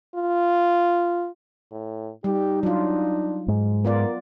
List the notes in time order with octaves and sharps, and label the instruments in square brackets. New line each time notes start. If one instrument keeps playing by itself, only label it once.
[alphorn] F4
A2
[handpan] G3 [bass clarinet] D#4 [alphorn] G4
[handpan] F#3 F4 [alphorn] D4
[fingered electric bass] G#2
[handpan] B3 F4 D5 [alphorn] A#4